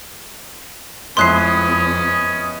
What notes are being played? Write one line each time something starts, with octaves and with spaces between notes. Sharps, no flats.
F2 A2 G#3 B3 C#4 C6 F#6 C7
B3